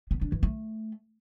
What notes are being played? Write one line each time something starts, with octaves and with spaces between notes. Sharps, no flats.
B3
D4
E3
A3